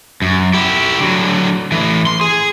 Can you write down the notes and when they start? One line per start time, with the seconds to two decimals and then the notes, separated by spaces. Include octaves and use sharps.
0.22 F#2
0.54 E4 G4
1.00 D3 F#3
1.72 A2 E3
2.07 C6
2.21 G#4